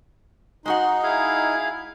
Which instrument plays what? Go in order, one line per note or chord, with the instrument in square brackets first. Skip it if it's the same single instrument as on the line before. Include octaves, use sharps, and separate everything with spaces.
[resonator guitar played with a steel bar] G#3 F#4 F#5 [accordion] D#4 [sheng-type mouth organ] C6
[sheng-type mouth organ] E4 G#4 F5